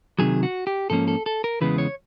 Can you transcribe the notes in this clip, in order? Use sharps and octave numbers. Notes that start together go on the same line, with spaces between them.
C3 D#3 F#3 G#4
F#4
G4
G#2 F3 A#3 C#4 A4
A4
A4
A#4
E2 C#3 E3 G#3 B3 B4
C#5